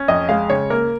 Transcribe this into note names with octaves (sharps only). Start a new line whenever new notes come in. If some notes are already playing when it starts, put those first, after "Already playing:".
Already playing: C#4
F2 D#5
G#3 F5
C#3 C#5
A#3 A#4